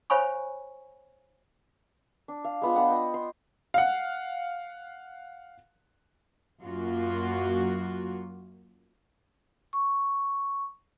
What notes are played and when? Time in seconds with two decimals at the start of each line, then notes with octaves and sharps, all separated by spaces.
0.10 C5 C#5 F5 G#5 B5 C#6
2.28 D4
2.44 F5
2.62 G#3 B3 F4
2.74 B3 D4 F#5 G5
2.90 D#5 G5
3.14 C6
3.74 F5 F#5
6.62 F#2 A#3 F4 F#4
9.73 C#6